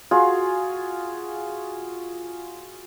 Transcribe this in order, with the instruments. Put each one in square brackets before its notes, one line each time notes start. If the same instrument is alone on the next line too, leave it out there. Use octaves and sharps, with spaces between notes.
[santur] F4 F#4 G#4